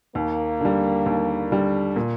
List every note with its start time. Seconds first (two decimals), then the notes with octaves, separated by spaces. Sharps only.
0.15 D#2 A#3
0.61 D3 G3
1.06 D#2
1.51 D3 G3
1.96 A#2